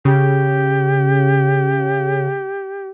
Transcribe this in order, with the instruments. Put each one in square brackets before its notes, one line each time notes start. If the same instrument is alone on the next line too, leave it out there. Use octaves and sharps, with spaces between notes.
[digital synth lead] C#3 [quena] G4